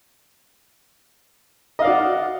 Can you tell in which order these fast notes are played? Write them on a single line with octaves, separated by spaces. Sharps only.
D#5 F5 D5 F#4